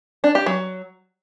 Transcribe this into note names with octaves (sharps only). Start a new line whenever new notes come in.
D4
G4
F#3